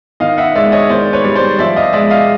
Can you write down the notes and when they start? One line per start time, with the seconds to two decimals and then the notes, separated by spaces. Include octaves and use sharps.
0.20 D#3 D#5 F5
0.38 E5 F#5
0.55 G#3 D5 E5
0.72 C#5 D#5
0.89 D#3 C5 D5
1.13 B4 C#5
1.24 G3
1.35 C5 D5
1.59 F3 D5 E5
1.76 D#5 F5
1.93 G#3 D5 E5
2.10 D#5 F5